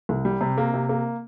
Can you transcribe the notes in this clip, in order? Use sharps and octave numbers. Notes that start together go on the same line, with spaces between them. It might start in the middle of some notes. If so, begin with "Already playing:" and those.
C2
G3
C3
A#3
C3
A#3